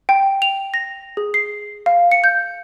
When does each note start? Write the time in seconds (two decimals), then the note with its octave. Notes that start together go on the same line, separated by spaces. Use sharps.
0.09 G5
0.42 F7
0.74 A#6
1.17 G#4
1.34 C7
1.86 F5
2.12 C#7
2.24 G6